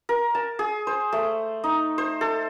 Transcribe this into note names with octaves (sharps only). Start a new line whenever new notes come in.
A#4
A5
G#4
C5
A3
D#4
C5
A4